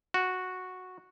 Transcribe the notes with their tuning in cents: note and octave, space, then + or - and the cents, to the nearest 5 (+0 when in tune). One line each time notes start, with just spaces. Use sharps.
F#4 -5